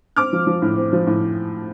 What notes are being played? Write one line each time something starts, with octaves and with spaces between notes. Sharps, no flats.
C4 D6 F6
F3
F3
A2
C4
F3
A2